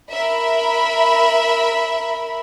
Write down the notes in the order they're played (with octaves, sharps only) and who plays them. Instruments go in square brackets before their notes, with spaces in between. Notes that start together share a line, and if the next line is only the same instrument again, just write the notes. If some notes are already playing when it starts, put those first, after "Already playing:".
[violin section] A#4 E5 B5